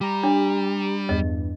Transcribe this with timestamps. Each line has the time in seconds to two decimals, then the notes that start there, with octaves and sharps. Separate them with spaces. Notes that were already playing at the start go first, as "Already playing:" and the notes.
0.01 G3 G4 A#5
0.23 D4
1.09 E2 G2 D#5